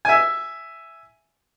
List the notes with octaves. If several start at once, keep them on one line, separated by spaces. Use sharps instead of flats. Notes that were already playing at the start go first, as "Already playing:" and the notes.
E5 G#5